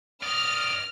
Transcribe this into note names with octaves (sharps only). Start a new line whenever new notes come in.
D5 D#5 F6